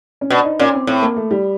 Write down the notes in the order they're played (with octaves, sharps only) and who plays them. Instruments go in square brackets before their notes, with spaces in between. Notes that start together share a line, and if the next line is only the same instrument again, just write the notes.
[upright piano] C#4
[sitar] B2 [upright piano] D4
[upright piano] D#4
[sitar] A#2 [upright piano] C#4
[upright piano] C4
[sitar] A2 [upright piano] C4
[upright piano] A#3
A3
G3